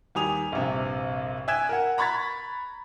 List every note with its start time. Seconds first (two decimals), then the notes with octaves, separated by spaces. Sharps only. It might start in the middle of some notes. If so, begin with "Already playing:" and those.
0.15 D#2 G3 G#5 D#6 F7
0.52 A#1 G2 C3
1.48 E5 G5 G#5 F#6 G#6 E7
1.69 A#4 F#5
1.98 A#5 B5 C#6 G#6 A6 B6